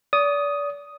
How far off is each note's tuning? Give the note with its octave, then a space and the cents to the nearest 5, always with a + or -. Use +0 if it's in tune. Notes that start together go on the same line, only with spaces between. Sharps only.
D5 -35 D#6 +0